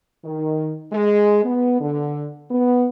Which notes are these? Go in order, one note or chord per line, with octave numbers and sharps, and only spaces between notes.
D#3
G#3
B3
D3
B3